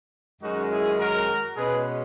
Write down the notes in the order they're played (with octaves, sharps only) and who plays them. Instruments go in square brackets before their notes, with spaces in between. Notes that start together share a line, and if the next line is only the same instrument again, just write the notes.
[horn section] F#2 D#3 G#3 C#4 D#4 F#4
E4 G#4
F#4 A#4
B2 G#3 C#4 G#4 B4